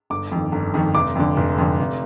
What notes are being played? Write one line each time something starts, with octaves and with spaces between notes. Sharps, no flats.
G1 D6
F2 D#3
G1
F2 D#3
F1 D6
F2 D3
F1
F2 D3
F1